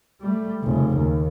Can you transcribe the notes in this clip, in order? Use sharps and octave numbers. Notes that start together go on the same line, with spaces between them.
G3 A3
F1 C#3
D#2